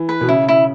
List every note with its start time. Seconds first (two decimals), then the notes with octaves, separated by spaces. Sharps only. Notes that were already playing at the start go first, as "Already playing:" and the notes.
Already playing: E3
0.09 B4
0.21 B2
0.28 C#3 E4
0.48 E4